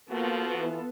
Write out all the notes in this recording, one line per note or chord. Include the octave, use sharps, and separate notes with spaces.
F3 A#3 B3 F4 F#4 A4
E3